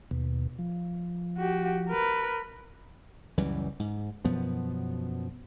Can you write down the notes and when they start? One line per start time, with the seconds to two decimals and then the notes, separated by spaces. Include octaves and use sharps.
0.11 D#2 B2
0.58 F3
1.38 F#4 G4
1.90 A#4 B4
3.37 C#2 F#2 E3 G3
3.79 G#2
4.25 F#2 B2 F3 B3